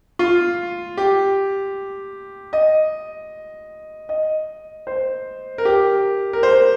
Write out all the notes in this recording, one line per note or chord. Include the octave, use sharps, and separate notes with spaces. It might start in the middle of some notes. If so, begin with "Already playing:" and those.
F4
G4
D#5
D#5
C5
A#4
G4
A#4
C5